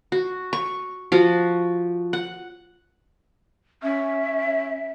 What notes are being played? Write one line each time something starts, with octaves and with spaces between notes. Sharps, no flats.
F#4
C#6
F3 F#4
F#5
C#4 E5